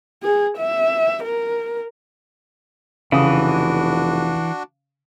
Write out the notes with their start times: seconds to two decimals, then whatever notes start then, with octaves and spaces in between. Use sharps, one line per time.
0.23 G#4
0.58 E5
1.23 A#4
3.12 F1 C#3 E3 D4 F#4 D#6